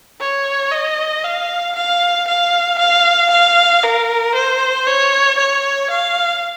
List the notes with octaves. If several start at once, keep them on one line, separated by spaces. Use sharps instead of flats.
C#5
D#5
F5
F5
F5
F5
F5
A#4
C5
C#5
C#5
F5